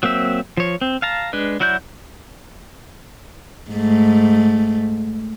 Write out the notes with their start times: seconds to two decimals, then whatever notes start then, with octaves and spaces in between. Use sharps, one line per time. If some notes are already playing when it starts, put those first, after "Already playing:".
0.03 F#3 A#3 C4 E5
0.57 F3 C#5
0.81 C4
1.02 F5 A5 A#5
1.33 G#3 D4 B4
1.60 F#3 E4 F#4 D5 G6
3.72 G#2 A3